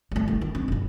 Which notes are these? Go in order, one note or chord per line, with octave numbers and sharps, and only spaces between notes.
G#3 A3
D#3
D#3
C4
F#1 G#2